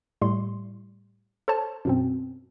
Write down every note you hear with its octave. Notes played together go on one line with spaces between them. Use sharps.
A2 G3 C6
A4 C5 C#5 A5
F#2 B2 C4